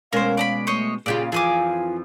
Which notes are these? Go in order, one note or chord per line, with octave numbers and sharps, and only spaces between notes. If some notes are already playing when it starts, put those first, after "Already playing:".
B2 G#3 C#4 A#4 C5 F5
D5 A#5 B5
A3 C5 C#5 D#5
A#2 C#3 F4 G4 G#4 D5
F2 E3 F3 F4 G#4 G#5 D6